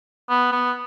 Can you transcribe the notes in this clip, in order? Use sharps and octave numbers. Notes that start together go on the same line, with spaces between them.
B3
B3